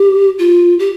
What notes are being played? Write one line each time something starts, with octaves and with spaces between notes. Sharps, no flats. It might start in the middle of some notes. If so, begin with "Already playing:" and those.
Already playing: G4
F4
G4